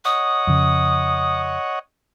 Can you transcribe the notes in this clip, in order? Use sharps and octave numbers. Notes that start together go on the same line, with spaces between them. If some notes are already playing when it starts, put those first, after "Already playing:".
C#5 D#5 F#5 D#6
F2 C#3